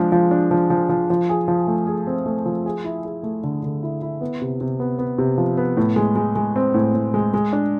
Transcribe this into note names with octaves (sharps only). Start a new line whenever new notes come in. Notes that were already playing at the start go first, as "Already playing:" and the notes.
Already playing: F3 G#3 D4
F3
D4
F3
F3
F3
F3
G#4
F3
A3
G#4
C4
A3
F3
G#4
E4
G#4
A3
D3
D3
E4
E4
B3
C3
C3
B3
B3
C3
F3
B3
A2
G#3
G#3
G#3
C4
A2
A2
G#3
G#3
D4